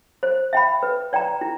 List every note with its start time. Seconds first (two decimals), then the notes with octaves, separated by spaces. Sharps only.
0.23 C5
0.53 E5 G5 B5
0.83 B4
1.13 D5 G5 A#5
1.41 E4